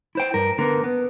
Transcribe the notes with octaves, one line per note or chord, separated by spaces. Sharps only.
E4 C5 G5
G2 A#4
D3 A#3 B3 A#4
B3